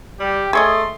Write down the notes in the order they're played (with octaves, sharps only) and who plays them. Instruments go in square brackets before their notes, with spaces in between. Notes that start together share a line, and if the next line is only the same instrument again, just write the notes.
[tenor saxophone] G3 [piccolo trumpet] G4
[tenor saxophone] A3 [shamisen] G#4 C#5 D#5 [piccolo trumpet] C6